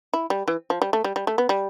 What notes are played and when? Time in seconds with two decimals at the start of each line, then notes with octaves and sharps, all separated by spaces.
0.14 E4
0.30 G3
0.48 E3
0.70 F3
0.82 G3
0.93 A3
1.04 G3
1.16 G3
1.27 A3
1.38 B3
1.49 G3